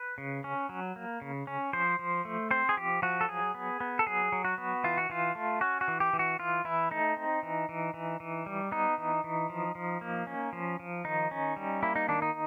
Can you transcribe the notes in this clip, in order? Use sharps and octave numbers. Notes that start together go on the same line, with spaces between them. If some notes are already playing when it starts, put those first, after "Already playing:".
Already playing: B4
C#3
C#4
F#3
A#3
C#3
C#4
F3 C5
F3
A3
C4 C5
G#4
F3 G4
F3 F#4
A4
F#3 G#4
B3
B3
A4
F#3 G#4
F#3
F#4
B3
E3 F4
F#4
E3 F4
A3
C#4 F#4
F#4
E3
G4
E3
F#4
E3 F4
E3 E4
A3 D#4
C4
E3
E3
E3
E3
G3
B3 D#4
E3
E3
F3
F3
A#3
C#4
F3
F3
D#3 D#4
C#4
G3
A#3 E4
D#4
D#3 D4
D#4